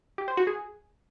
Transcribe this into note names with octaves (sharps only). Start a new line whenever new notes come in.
G4
C5
F#4
G#4